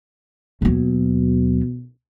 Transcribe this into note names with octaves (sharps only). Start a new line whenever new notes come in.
D#2 B2 F#3